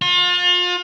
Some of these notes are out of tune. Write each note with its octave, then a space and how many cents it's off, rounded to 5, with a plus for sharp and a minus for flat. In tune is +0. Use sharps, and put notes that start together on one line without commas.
F4 +35